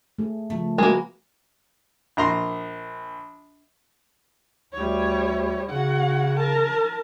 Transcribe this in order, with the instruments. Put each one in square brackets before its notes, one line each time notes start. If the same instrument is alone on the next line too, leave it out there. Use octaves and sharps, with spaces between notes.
[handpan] A3 G#4
[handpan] C#3 F3 B3 [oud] A3
[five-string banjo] G#3 A#3 [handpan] F#4 B4
[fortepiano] A#1 A#5 C6
[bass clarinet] D2 [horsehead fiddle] G3 C#5
[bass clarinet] C#3 [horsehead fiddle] F#4 F#5
[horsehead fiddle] A#4 A5